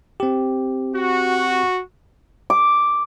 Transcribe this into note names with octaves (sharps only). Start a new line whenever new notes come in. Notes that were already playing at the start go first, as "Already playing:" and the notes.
C4 G4
F#4
D6